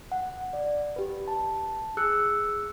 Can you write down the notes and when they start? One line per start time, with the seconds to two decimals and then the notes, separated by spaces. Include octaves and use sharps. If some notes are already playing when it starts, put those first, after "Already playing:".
0.12 F#5
0.53 D5
0.96 G4 B4
1.28 A5
1.97 G#4 E6 F#6 C#7